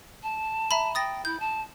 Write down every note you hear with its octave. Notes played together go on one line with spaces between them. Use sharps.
A5
E5 A#5 B5
G5 D#6 A6 A#6
E4 G6
A5